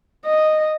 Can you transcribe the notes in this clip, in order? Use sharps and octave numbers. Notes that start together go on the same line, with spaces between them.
D#5